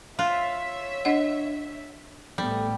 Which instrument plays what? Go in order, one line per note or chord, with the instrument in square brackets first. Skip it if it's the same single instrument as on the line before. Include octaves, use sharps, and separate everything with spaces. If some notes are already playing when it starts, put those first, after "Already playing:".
[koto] F4 [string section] C#5 E5
[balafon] D4 D#5 F#5
[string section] A1 A3 B3 [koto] G3